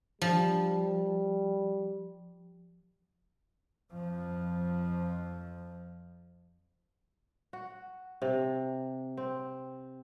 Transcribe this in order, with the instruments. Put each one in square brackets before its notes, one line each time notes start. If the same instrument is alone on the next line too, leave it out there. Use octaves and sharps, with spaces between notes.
[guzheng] F3 [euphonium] G3
[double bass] F2 F3
[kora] F#4
C3
C4